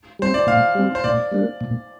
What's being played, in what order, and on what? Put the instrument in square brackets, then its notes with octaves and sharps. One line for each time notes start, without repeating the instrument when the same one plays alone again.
[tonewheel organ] G3 C4 [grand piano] C5
[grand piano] D5
[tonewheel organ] A#2 [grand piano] F5
[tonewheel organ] G3 C4
[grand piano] C5
[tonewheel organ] A#2 [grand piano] D5
[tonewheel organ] G3 A#3 D4
A#2